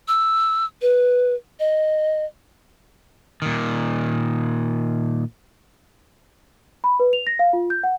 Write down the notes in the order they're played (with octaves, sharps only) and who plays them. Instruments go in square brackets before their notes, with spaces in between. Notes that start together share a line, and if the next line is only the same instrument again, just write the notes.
[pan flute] E6
B4
D#5
[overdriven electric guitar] A#2 D#3
[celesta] B5
B4
F7
A#6
F5
F4
G6
F#5